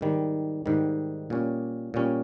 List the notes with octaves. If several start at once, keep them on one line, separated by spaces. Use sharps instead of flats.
G#2 D#3 G3
G#2 D#3 G3
A#2 G3 C#4
A#2 G3 C#4